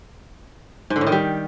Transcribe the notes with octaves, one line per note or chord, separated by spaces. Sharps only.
G#2
D3
A2
D#3
G3